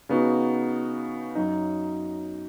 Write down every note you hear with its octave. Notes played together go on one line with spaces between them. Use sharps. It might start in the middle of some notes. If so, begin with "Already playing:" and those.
C#3 B3 D#4 F#4
F#2 F#3 D#4